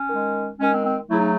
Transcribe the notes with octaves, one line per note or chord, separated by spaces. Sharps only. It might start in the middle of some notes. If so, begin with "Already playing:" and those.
Already playing: C#4
D#3 G#3
D#3 G#3 C#4
C4
C4
C#3 F#3 A3 E4
D#4